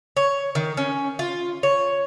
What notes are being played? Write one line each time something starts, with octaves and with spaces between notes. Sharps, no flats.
C#5
D#3
C#4
F4
C#5